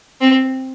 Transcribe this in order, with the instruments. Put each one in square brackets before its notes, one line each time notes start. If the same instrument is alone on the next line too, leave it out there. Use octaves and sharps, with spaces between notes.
[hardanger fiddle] C4